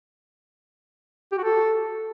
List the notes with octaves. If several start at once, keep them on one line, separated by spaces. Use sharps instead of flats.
G4
F#4
A4